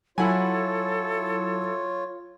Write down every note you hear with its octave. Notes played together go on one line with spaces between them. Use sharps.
F#3 E4 F4 A4 C#5 F#5 G#5